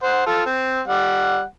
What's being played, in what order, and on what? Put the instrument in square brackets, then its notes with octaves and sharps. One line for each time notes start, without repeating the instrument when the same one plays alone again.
[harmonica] C5 F#5
F4 A4
C4
G3 F#5